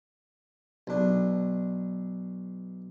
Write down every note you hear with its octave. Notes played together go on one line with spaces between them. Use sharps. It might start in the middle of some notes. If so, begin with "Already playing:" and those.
B1 D4